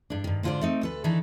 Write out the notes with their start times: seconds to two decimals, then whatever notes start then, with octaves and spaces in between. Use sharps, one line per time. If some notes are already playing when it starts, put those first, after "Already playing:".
0.10 G2 D4
0.24 G2 D#3
0.43 G#2 D3 F4 G#4 C5 D5
0.61 A3 C4 D#4
0.81 D2 A4 B4
1.04 D#3 E3 D4 E4 A4